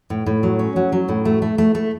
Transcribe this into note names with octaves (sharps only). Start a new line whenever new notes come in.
A2
A2
F#3
C#4
F#3
F#3
A2
A3
A3
A3
A3